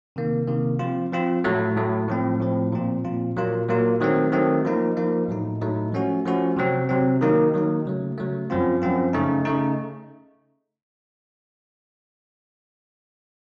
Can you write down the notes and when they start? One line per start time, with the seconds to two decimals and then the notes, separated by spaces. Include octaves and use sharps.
0.16 C3 D#3 A#3
0.47 C3 D#3 A#3
0.79 F3 C4 F4
1.12 F3 C4 F4
1.44 A2 F#3 A3
1.76 A2 F#3 A3
2.08 A2 F3 C4
2.40 A2 F3 C4
2.72 A#2 F3 C4 F4
3.05 A#2 F3 C4 F4
3.37 A#2 F#3 A#3 F4
3.69 A#2 F#3 A#3 F4
4.00 D#3 F#3 A3 C4
4.32 D#3 F#3 A3 C4
4.65 F3 A#3 D#4
4.97 F3 A#3 D#4
5.28 A2 F#3 A3 D#4
5.61 A2 F#3 A3 D#4
5.92 F3 A3 C#4 F#4
6.26 F3 A3 C#4 F#4
6.57 C3 F#3 C4
6.89 C3 F#3 C4
7.21 D#3 F#3 A#3 D#4
7.54 D#3 F#3 A#3 D#4
7.85 C#3 F#3 A3
8.18 C#3 F#3 A3
8.50 F#2 F3 C4 F4
8.82 F#2 F3 C4 F4
9.13 C#3 A3 D#4
9.45 C#3 A3 D#4